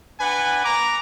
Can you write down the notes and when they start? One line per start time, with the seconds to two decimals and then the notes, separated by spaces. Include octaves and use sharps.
0.19 D4 B4 F#5 G#5
0.63 A#5 D6